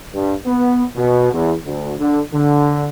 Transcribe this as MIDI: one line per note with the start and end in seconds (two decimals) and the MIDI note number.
0.13 0.34 43
0.46 0.84 59
0.96 1.31 47
1.33 1.54 40
1.65 1.93 38
1.99 2.20 50
2.33 2.89 50